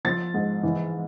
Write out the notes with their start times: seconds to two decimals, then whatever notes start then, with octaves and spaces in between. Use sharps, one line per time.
0.05 F3 A6
0.34 G#2
0.63 E3